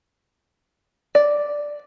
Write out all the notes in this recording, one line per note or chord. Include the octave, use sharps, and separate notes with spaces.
D5